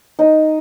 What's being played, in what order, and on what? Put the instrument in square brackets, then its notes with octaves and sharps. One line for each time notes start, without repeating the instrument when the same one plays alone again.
[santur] D#4